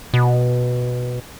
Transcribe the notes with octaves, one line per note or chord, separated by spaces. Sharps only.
B2